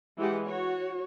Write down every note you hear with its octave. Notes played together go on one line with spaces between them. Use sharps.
E3 G#3 G4 F#5
F#4 C#5